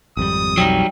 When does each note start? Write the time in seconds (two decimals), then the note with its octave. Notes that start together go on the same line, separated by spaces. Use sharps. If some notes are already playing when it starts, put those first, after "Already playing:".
0.17 G#1 F2 G3 D#6
0.57 B1 F2 F#3 G3 D#4 G5